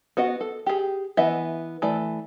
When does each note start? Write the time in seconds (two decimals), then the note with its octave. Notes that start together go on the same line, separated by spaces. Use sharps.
0.17 B3 F#4 D#5 F#5
0.41 A4
0.66 G4 G#4
1.17 E3 B3 D#5 E5
1.82 E3 A3 D5